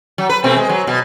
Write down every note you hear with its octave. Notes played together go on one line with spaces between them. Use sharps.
F#3
B4
B2 A3 C4
G#3
F#3
B2